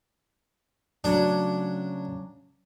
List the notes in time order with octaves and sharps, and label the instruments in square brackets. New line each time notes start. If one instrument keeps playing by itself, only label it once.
[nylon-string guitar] C#3 F#3 A3 [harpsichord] D4